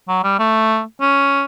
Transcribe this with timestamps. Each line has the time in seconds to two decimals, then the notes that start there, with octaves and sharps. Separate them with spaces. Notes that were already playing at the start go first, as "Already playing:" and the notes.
0.09 F#3
0.24 G3
0.39 A3
1.01 C#4